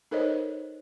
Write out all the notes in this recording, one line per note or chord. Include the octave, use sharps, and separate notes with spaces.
D#4 A4 A#4 C5 C#5 D#5